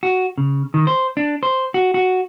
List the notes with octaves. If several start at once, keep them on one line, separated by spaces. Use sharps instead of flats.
F#4
C#3
D#3
C5
D4
C5
F#4
F#4